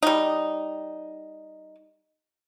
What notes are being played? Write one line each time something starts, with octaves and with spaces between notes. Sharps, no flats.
G3 D#4